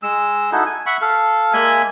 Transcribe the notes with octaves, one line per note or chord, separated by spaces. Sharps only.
G#3 E6
D#4 E4 F#4 A4
G#5
E5 F#5 B5 C#6
A4 F5
G#3 A#3 E5 G#5